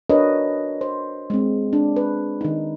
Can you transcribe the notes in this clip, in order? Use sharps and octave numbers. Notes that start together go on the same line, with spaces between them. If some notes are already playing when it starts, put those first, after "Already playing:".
D4 F#4 A#4 B4 C#5 D#5
C5
G#3 C4
D4
B4
D#3 D#4